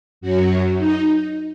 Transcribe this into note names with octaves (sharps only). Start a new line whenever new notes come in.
F#2 F#3 F#4
D#4